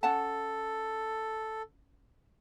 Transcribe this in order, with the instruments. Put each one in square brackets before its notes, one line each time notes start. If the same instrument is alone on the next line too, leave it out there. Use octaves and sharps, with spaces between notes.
[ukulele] C#4 F#5 A5 [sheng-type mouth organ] A4